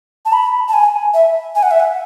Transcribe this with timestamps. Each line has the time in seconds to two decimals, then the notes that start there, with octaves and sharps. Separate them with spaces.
0.25 A5
0.33 B5
0.68 A5
0.73 G#5
1.14 E5
1.55 G#5
1.63 F#5
1.71 E5
1.80 F#5